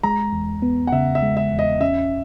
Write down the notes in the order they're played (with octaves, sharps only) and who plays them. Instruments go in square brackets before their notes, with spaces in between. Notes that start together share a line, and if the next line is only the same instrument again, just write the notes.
[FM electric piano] G#3 [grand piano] A#5
[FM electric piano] E2
B3
[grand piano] F#5
[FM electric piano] C#3 [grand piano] E5
[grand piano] E5
[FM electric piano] G#3
[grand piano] E5
[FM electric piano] E2
[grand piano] D#5
[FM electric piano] C#4 [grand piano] E5